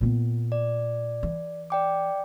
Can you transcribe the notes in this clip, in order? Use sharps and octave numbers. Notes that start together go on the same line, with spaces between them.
A#2 B3
D5
E3
D5 G5 D6